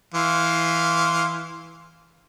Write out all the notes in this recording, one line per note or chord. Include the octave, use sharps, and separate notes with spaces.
E3 F5 C6